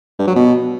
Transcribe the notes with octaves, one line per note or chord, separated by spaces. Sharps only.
G2
F#3
B2